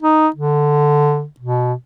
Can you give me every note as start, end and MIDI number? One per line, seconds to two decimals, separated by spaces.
0.03 0.28 63
0.36 1.25 50
1.40 1.74 47